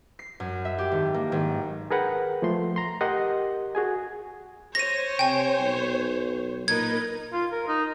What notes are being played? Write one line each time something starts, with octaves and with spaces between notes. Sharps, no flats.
C7
F#2
E5
G4
G#1
A#3
G#1
G#4 A#4 B4 F#5 G5
F3 A3 C6
A#5 C6
G4 A#4 D#5 F#5 C6
F#4 G#4 G#5
C5 C#5 A#6 D#7
C3 G5 G#5
B1
A#2 D#4 A#4 B4 G#6
F4
A#4
D#4